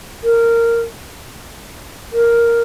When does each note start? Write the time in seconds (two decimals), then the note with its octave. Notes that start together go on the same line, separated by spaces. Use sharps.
0.24 A#4
2.13 A#4